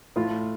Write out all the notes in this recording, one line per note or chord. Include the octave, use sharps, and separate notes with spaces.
A2 F4